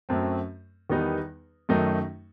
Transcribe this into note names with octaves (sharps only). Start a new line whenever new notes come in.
F#2 F#3 A3 C4
E2 D#3 G3 B3 D#4
F#2 D#3 F#3 A3 D#4